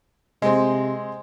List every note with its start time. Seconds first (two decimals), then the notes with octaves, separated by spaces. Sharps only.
0.42 C3 G#3 C4